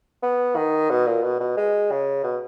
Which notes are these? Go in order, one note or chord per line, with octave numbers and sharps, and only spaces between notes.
B3
D#3
B2
A#2
B2
B2
G#3
C#3
B2